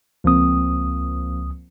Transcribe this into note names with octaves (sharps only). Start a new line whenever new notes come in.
C#2 F3 A#3 C4 D#6